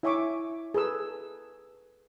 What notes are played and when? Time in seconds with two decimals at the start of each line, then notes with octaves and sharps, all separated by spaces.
0.03 E4 C#5 E5 G#5 C#6 D6
0.74 G#4 A4 B4 E6